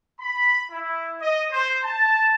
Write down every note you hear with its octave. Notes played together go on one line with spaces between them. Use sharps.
B5
E4
D#5
C5
A5